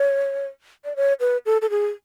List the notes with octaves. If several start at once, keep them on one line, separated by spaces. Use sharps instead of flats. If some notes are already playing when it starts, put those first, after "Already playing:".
Already playing: C#5
D5
C#5
B4
A4
A4
G#4